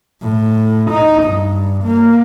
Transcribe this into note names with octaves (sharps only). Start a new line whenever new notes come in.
A2
D#4
G2
A#3